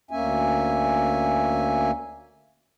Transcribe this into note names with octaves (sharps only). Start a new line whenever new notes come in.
D2 A#3 C#4 E5 G#5